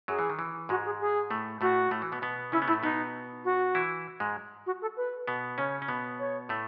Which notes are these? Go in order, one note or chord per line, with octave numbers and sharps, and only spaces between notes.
F#2 F#3 G#4
E3
D#3
E3
G#2 G#3 F#4
G#4
G#4
A2 A3
A2 A3 F#4
A2 A3
E3
B2 B3
B2 B3
C#3 C#4 E4
B3
A2 A3 E4
B2 B3 D#4
F#4
E3 E4
G#2 G#3
F#4
A4
B4
B2 B3
C#3 C#4 C#5
C#4
B2 B3
C#5
A2 A3